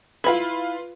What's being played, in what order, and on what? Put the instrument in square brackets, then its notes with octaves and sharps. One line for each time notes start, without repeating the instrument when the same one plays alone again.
[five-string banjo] E4 B5 [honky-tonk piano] F4 B4